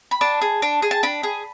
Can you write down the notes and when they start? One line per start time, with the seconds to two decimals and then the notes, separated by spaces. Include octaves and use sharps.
0.11 B5
0.21 D4 A5
0.42 G#4
0.62 D4
0.82 G#4
0.91 A5
1.03 D4 B5
1.23 G#4